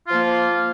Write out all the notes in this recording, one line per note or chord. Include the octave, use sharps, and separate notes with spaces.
F3 A#3 F4